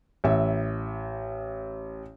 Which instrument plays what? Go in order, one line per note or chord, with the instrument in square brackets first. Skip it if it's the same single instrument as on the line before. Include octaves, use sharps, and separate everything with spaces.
[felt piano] A1 E5